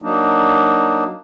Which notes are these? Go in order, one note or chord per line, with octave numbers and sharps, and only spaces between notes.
F#3 A#3 D4 D#4